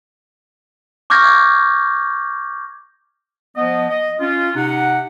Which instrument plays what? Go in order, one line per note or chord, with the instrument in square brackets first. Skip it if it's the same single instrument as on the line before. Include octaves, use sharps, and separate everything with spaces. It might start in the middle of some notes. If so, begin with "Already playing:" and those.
[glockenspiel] C#6 D6 F6 G6 G#6 A#6
[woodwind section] F3 B3 D#5
D#5
C#4 F4
C3 D#4 F#5